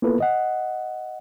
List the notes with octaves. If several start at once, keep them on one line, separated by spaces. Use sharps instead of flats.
A#3 B3 E4 F4 A4 B4
D#5 F#5